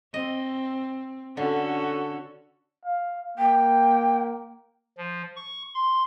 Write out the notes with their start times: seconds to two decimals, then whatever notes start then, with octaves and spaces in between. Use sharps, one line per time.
0.14 C4 D#5
1.37 D3 C#4 F#4 A4
2.85 F5
3.38 A#3 G5
4.98 F3
5.36 C#6
5.74 C6